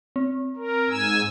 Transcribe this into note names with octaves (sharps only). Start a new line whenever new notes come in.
C4
A#4
G#2 G#5 E6